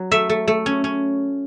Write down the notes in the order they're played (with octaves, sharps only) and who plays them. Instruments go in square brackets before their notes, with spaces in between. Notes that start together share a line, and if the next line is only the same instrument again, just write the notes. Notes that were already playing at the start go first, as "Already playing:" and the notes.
Already playing: [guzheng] F#3
A3 E5
A3
A3
C#4
C#4